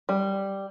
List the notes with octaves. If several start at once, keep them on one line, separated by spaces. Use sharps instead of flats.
G3